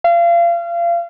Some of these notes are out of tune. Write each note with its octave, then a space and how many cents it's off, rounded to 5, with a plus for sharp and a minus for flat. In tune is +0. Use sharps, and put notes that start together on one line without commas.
F5 -35